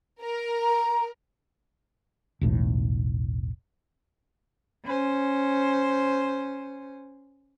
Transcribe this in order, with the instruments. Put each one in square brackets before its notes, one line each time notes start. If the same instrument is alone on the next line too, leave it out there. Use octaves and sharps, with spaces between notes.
[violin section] A#4
[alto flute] A#5
[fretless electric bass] E1 B1 A2 E3
[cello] C#4 C5